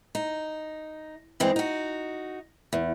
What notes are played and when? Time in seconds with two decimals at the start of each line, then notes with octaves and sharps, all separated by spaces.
0.15 D#4
1.40 G2 E3 G#3 C4
1.56 D#4 F#4
2.73 E2